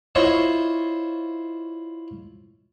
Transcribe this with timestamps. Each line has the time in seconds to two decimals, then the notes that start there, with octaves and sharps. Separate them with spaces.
0.15 E4 F4 C5 C#5 D#5 E5